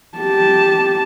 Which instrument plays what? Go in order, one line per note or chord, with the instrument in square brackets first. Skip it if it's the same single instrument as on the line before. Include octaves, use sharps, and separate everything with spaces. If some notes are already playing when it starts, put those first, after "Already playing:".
[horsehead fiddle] G4 A5